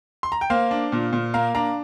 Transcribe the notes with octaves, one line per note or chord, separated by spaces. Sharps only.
C6
A#5
G5
A#3 C5 F5
D4
A#2
A#2
A#3 F5 A#5
D4 F5 A#5